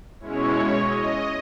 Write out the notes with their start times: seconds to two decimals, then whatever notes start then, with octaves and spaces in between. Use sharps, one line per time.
0.20 B2 G#3 C#4 E4 C#5
0.72 D#5